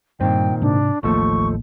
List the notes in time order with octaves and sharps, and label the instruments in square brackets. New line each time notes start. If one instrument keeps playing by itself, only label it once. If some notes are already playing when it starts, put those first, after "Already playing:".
[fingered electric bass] G2 [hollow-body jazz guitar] A#2 D#3 C4 [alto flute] G5
[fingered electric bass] G#2 C3 [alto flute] D4
[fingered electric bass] A1 A#3 [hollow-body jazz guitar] D#2 F3 A3 [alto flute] C#6